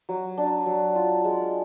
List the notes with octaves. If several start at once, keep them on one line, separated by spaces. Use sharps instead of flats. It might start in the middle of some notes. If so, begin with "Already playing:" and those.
F#3
D4
F#3
F4
G#3